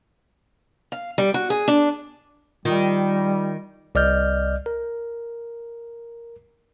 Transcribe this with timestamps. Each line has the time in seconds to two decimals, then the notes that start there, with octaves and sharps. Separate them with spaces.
0.92 F5
1.18 G3
1.34 F#4
1.50 G#4
1.68 D4
2.65 D#3 G3 F4 D#6
3.95 C2 D5 D#5 F6 G6
4.66 A#4